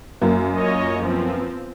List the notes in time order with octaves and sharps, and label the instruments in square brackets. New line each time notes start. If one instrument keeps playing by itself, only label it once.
[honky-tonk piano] F#2 A#3
[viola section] F4 C#5 D#5
F3 B3 C4